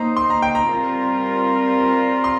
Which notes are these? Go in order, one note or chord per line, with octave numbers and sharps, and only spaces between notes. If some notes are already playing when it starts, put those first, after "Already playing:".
Already playing: A#3 D#4 C5 A#5
C6
A#5
G5
A#5
G3 C4 F4 A#4
C6